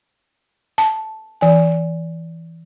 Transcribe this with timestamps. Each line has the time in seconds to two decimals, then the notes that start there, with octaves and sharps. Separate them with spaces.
0.78 A5
1.41 E3 G#5